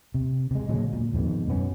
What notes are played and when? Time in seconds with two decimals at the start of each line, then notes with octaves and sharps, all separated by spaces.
0.14 C3
0.51 C3 G#3
0.69 A#2 D3 F#3 G#3
0.93 A#2
1.13 F2 G#2 B2 D#3
1.48 F#2 B2 B3 C#4